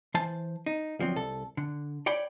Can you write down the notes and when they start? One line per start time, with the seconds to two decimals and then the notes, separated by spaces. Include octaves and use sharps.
0.14 E3 C5 A5
0.66 D#4
0.99 D2 F3 F#3 C4
1.16 C2 A4
1.57 D3
2.06 C#5 D5 G5 B5